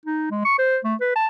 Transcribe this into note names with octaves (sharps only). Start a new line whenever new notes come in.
D#4
G#3
C#6
C5
A3
B4
A5